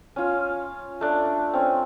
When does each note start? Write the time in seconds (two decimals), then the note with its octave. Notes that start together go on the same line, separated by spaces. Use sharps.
0.16 C#4 F4
1.01 A3 D4
1.53 C4 C#4